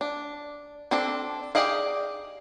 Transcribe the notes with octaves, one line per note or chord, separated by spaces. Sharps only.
D4
C4 D4 A4
G4 G#4 D5 D#5 F5